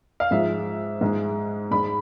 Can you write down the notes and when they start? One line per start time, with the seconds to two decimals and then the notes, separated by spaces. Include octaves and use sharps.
0.20 F5
0.31 G#2 F3 G#3 E5
1.01 G#2 G#3
1.71 G#2 G#3 B5